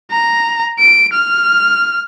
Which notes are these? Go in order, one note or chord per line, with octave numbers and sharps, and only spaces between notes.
A#5
D7
F6